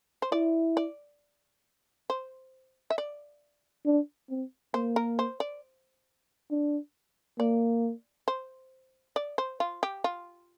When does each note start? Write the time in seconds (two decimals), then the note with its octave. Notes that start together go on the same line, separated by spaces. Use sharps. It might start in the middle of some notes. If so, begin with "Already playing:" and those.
0.22 C5
0.32 E4 D5
0.77 D5
2.10 C5
2.90 E5
2.98 D5
3.86 D4
4.30 C4
4.74 A#3 C5
4.96 A#4
5.19 C5
5.40 D5
6.51 D4
7.39 A#3 D5
8.28 C5
9.16 D5
9.38 C5
9.60 F4
9.83 G4
10.04 F4